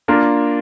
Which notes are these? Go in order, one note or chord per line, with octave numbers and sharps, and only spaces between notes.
A#3 D4 F4 A#4